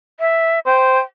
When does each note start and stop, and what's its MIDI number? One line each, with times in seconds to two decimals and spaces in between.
0.20 0.59 76
0.66 0.99 72
0.66 1.00 79